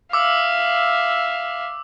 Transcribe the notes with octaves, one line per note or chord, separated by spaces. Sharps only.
E5 F5 D6 E6